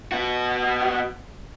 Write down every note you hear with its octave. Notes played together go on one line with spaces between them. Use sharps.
B3 F#4